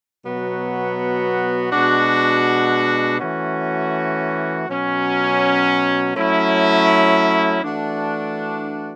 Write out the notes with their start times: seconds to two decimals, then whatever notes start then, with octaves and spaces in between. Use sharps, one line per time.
0.24 B2 F#3 B3 F#4
1.72 B2 G#3 D4 F#4
3.20 E3 A3 C#4 F#4
4.67 B2 F#3 C#4
6.15 F#3 A3 C#4 E4
7.62 E3 A3 D4 F#4